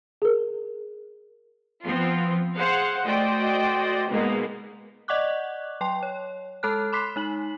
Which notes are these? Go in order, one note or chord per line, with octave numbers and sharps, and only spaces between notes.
G#4 A#4
F3 B3 C4 F4
G#4 C5 F5 F#5
A3 F#4 C5 D5 D#5 G5
G#2 B2 G#3 A#3 B3
D5 D#5 F#5 C#6 D6 F#6
F#3 G5 C6
C#5
G#3 A4 A5 F6 F#6
B5 C6 D6 F#6 B6 C7
G#3 D#4 F#7